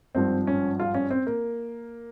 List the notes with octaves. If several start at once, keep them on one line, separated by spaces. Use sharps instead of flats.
G#1 G2 F3 C4
C#4
F4
C#4
C4
A#3